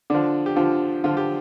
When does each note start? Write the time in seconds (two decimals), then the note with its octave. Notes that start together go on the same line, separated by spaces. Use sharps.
0.10 D3 F3 D4
0.46 G4
0.56 D3 F3 F4
1.04 D3 F3 F4
1.17 G4